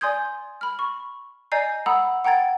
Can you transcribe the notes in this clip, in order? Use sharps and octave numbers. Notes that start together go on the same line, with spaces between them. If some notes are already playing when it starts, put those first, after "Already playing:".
D5 G#5 C6 D#6 G6 G#6
B5 F6
C#6
D5 D#5 G#5 A#5 G6 C7
F#5 A#5 B5 D#6 E6
F#5 G5 A#5 G#6 A6